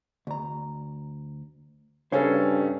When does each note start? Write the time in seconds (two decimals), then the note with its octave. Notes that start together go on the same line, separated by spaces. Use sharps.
0.27 D2 A#5
2.12 G2 C#3 C#4 A4 C5 C#5 F5